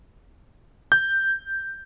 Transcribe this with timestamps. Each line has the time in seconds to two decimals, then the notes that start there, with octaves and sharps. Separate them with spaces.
0.92 G6